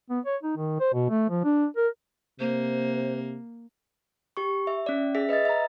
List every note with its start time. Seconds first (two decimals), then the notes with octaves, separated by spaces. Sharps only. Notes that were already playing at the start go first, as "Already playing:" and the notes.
0.10 B3
0.25 C#5
0.43 D#4
0.57 D#3
0.80 C5
0.94 B2
1.10 A3
1.30 F3
1.44 D4
1.77 A#4
2.40 C3 A#3 C5
4.37 G4 C#6
4.67 E5
4.86 C#4 D5
5.15 G#4 E5 B6
5.29 B4 D#5 E5 A6
5.45 E5 A#5